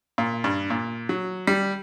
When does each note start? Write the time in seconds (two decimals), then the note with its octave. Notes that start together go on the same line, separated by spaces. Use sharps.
0.18 A#2
0.44 G2
0.70 A#2
1.09 F#3
1.47 G3